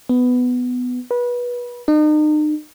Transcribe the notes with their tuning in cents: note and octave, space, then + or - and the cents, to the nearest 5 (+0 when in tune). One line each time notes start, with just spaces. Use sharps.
B3 +10
B4 -25
D#4 -40